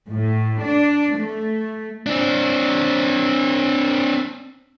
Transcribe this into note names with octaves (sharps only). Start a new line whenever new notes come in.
A2
D4
A3
C4 D4